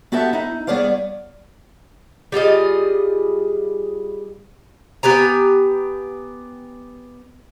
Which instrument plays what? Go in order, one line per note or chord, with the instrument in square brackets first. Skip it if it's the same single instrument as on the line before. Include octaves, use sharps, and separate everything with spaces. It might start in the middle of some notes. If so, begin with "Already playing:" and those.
[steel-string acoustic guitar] B3 F#4 G4 A4 E5 A5
D#4 E4
G3 B3 G#4 C#5 D5 F5
[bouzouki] G3 F4 G#4 D#5
B3 G4 G#5 A#5